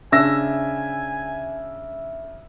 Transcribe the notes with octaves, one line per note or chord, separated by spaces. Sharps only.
C#3 D4 E5 G#5 A#6